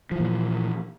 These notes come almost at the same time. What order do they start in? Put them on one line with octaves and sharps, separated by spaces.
F3 E3 A#2